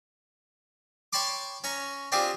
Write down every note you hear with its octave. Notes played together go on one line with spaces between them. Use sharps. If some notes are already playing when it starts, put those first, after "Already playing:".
C#5 G5 A5 B5 C6 D6
C#4 C#5 A#5
C4 D4 F4 G4 G#4